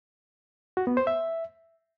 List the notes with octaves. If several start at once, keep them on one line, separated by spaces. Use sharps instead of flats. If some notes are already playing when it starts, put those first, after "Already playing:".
F#4
B3
C5
E5